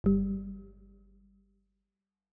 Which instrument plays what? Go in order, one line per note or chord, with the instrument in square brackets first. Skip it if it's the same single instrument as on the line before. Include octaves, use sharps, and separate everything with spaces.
[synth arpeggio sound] G1 G3